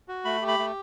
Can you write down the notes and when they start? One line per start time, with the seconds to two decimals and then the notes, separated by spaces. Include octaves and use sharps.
0.08 F#4
0.25 A3 B5
0.42 G4
0.48 B5
0.59 A3